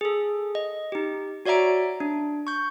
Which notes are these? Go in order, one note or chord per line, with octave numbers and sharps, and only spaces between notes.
G#4 A4
D#5
D#4 G4
F#4 C#5 D5 E5 A#5 D7
D4
C#6 G6